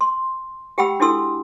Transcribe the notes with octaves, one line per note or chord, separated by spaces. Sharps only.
C6
G4 F#5 G5 B5 E6
D4 E4 F#4 A4 C6 E6